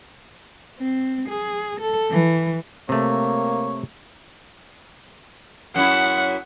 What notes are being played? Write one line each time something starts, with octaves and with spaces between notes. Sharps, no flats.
C4
G#4
A4
E3
C3 A3 A#3 C#5
F#2 E4 F#5